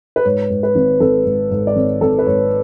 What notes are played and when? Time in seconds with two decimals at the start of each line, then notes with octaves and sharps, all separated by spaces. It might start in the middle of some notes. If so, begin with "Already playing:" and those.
0.16 B4
0.25 G#2 C#5
0.50 G#2
0.63 B4
0.75 G#1
1.00 G#1 A4
1.26 G#2
1.51 G#2
1.67 D5
1.76 G#1 C#5
2.01 G#1 A4
2.19 B4
2.27 G#2 C#5